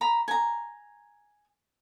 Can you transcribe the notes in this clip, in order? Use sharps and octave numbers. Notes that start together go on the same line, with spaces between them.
A#5 B5
G#5 A#5